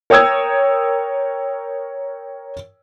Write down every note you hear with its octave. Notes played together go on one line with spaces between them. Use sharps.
A#4 C#5 G5 D#6 E6 G#6